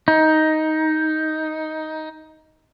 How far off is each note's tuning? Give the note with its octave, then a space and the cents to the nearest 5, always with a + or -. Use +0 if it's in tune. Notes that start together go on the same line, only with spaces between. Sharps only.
D#4 +10